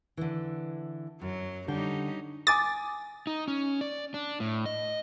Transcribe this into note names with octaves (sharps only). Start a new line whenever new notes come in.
D3 E3
F#2 F#3
D3 G3 C#4 D#4 G5
G#5 D6 D#6 A6
D#4
C#4
D5
D4
A2
D#5